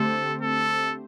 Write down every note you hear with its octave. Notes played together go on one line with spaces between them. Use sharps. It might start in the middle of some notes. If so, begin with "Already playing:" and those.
Already playing: D3 A3 C4 G4 A4 C5
A4